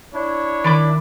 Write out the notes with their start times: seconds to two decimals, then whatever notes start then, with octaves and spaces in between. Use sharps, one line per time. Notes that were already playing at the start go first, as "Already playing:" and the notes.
0.14 D4 E4 C#5
0.64 D#3 D5 B5 D6